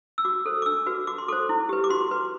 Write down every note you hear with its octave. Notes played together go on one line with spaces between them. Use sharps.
E6
F#4 D6
A4 C5
D6
D4 E6
F#4 B4
F#4 D6
C6
A4 C5 D6
E4
G4 B4
D6
F#4 C6
B4